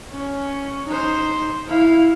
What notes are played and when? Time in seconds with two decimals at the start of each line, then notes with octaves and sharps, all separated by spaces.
0.11 C#4
0.86 D#4 C5
1.67 E4 F5